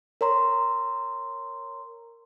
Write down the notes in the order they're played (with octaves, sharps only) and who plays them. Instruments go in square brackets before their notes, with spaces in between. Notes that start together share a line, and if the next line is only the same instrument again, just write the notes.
[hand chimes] A#4 C#5 A#5 C6